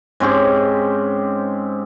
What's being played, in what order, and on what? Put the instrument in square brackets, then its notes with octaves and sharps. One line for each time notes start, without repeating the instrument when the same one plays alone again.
[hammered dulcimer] G#2 C4 C#4 G4